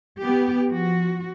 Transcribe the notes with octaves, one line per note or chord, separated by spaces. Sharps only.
B3 G4
F3 F#4